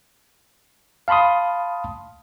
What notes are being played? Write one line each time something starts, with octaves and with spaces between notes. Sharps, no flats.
F5 A5 B5 C6 D#6